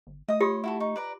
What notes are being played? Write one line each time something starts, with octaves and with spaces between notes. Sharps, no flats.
G1
A3 D#5 D#6
F4 G4 C#5 C6 D#6
E4 F#4 A4
D#4 C#6
B4 D5 A#5